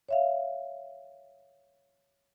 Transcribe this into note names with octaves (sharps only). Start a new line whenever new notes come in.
C#5 E5 F5